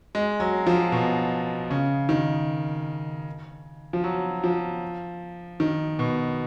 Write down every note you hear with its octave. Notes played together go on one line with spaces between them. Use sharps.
G#3
F#3
F3
B2
C#3
D#3
F3
F#3
F3
D#3
B2